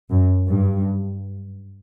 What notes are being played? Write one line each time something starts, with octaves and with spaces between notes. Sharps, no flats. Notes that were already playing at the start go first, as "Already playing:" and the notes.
F#2
G2